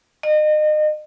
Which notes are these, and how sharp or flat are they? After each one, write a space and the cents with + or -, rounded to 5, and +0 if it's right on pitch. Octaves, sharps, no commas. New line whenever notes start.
D#5 -35